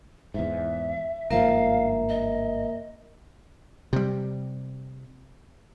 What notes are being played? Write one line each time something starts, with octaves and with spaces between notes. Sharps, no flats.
E2 G#2 E5
G1 G#2 F3 A#3 A#4 E5 F5
D#5
C3 G3